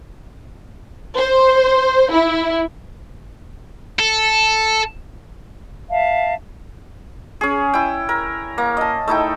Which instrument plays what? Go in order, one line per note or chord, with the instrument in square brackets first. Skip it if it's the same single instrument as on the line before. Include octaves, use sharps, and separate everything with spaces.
[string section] C5
E4
[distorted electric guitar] A4
[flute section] E5 F5 A5
[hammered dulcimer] C#4 G#4
E4 G5
A#4
A#3
D#5 A5
A3 D#4 E4 G5